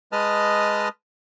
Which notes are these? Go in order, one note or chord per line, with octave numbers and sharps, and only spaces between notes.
G#3 B4 D#5 A5 D#6 F6